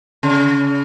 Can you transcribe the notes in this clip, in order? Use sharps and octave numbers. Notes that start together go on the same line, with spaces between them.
C#3